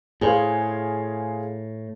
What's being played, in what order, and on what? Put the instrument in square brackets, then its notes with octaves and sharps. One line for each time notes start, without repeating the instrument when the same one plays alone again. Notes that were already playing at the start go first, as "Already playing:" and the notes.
[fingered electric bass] A2 [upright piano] G#4 C5 F5